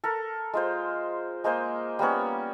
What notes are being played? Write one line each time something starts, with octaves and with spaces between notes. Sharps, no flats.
A4 A#4
G#3 F4 C5
G#3 A#3 C5 G#5
G3 A#3 B3 C#4